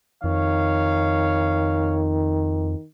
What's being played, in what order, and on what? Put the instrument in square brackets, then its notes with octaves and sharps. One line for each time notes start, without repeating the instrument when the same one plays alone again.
[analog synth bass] F2 [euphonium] D#3 [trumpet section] C#5 F5